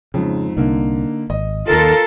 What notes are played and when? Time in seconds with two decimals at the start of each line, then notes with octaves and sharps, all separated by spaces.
0.14 F2 G#2 C#3
0.57 C2 D3 A#3 D#4
1.30 G#1 D#5
1.70 D#2 D#3 F4 A4 A#4